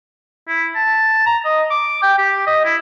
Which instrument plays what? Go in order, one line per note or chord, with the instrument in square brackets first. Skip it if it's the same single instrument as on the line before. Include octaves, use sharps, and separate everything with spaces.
[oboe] E4
A5
A#5
D#5
D6
G5
G4
D#5
E4